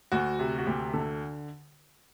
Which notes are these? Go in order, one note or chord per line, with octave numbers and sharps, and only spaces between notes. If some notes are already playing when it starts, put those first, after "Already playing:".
D2 F#4
C3
F#4
D2 G4
D3 A4